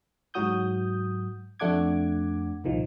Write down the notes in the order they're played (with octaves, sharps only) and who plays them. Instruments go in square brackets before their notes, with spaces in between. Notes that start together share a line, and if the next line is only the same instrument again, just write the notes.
[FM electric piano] G#2 F#3 F#4 D#6 G6
F2 A3 D4 F#5 D6 G#6
C2 A#2 D#3 F3